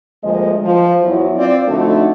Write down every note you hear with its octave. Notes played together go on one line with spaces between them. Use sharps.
D2 F3 G#3 A#3 D#5
F3
E2 F#3 E4
C4 F4 D5
F2 D3 A3 D4 D#4 F#4